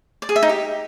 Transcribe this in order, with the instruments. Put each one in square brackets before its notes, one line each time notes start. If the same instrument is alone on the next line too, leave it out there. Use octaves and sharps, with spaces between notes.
[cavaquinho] D5
G#4
E5
D#4
G4